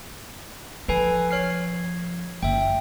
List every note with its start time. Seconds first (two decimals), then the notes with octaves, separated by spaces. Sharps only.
0.88 F3 A4 B4 G#5
1.31 C#5 F6 C7
2.43 F#1 E5 G5